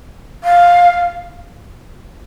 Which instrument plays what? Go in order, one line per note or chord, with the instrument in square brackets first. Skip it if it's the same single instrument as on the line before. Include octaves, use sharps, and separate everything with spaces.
[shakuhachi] F5